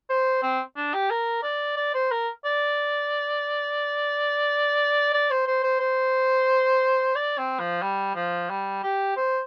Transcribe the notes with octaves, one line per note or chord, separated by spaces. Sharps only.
C5
C4
D4
G4
A#4
D5
D5
C5
A#4
D5
D5
C5
C5
C5
C5
D5
C4
F3
G3
F3
G3
G4
C5